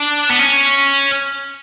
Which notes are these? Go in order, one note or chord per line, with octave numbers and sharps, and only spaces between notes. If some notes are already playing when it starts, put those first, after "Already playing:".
Already playing: D4
B3
C#4